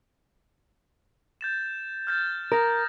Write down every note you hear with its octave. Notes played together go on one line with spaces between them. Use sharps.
G6 A6 E7
F6 G6 A6
A#4 D#6 A#6